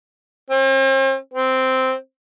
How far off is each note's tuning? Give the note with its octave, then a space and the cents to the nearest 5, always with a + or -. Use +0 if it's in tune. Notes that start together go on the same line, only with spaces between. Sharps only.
C4 +45
C4 -5